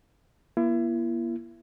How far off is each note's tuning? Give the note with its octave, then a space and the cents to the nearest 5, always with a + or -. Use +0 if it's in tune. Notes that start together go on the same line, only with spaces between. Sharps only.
A#3 +45 E4 +35